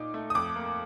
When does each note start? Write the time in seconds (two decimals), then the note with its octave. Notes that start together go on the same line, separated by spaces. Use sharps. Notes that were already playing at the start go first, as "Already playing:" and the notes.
Already playing: A#2 D#4 D6
0.14 A3
0.30 D#6
0.35 F2 D6
0.56 A#3